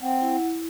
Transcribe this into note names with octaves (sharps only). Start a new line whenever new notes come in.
C4 F#5
E4